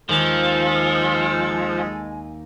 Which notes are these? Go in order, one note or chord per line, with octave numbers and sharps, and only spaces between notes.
D#2 F3 G#3 A4 G#5